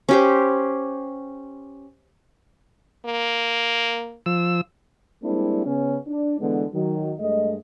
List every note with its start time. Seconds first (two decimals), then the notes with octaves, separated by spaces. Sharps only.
0.09 C#4 G4 C5
3.06 A#3
4.26 F3 E6
5.22 G3 G#3 A#3 C4 D4 E4
5.65 C#3 B3 C#4
6.07 D4
6.39 D3 E3 G#3 B3
6.73 D#3 F#3 D#4
7.19 G2 G#3 A3 D#5